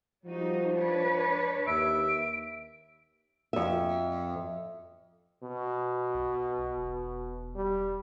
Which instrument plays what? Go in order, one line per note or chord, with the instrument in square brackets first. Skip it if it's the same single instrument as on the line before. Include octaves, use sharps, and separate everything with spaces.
[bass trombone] F3 [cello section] G3 D#4 F#4
[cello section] D4 B4 C#5
[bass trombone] D#2 [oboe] E5 [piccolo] D7
[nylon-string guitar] F2 E5
[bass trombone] B2
[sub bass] B1
E1
[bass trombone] G3